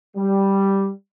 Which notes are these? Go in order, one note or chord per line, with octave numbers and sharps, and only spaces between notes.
G3